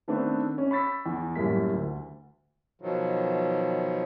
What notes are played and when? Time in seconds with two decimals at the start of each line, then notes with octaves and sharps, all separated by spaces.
0.08 D#3 A3 B3 C4 D4 B4
0.58 C#4
0.71 B5 C#6 E6 A6 B6
1.06 E2
1.35 F#2 A2 G3 A#3 B6
1.73 D2
2.81 B2 D#3 F3 F#3